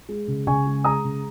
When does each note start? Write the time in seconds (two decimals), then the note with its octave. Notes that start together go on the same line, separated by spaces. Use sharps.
0.09 G#3
0.28 C#3
0.47 C#3 G#5 C#6
0.66 G#3
0.84 G#3 A#5 D#6
1.04 C#3